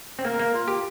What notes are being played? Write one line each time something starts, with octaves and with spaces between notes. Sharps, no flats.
C4
A#3 A#4
A#3
F4
G4